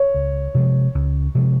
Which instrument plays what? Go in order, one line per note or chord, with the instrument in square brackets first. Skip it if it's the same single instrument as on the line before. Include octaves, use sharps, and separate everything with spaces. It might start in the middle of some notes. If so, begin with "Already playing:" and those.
Already playing: [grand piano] C#5
[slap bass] C#2
C3 F3 G#3
C#2
C3 F3 G#3